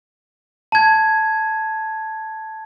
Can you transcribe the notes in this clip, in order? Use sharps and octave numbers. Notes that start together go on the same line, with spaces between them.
A5 G#6